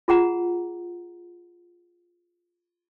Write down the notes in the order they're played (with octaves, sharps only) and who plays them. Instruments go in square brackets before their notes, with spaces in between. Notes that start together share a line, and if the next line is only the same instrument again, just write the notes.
[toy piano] F4 G#4 F#5 A#5